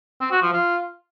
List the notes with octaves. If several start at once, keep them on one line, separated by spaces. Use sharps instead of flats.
C4
F#4
F3
F4